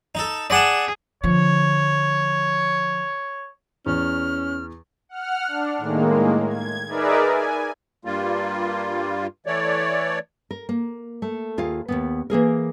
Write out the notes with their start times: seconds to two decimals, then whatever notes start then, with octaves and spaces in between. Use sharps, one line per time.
0.15 D#4 A4
0.50 G#4 D5 F#5 A5
1.24 D3 F3 C#5
3.86 E2 C#4 F6
5.09 F#5 F6
5.48 D4
5.78 A2 D#3 G#3 A#3
6.47 G#6
6.87 D#4 G#4 A#4 B4 D5 E5
7.21 G#5
8.05 G2 G3 A#3 F4
9.46 E3 A3 C#5 D5
10.51 A#4
10.69 A#3
11.22 A3
11.58 D#2 F4 G#4 F5
11.88 D#2 D#3 B3
12.30 E3 A#3 G#4 A#4